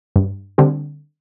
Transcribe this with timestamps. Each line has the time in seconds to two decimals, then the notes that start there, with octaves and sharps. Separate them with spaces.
0.16 G2
0.58 D3 G3 C4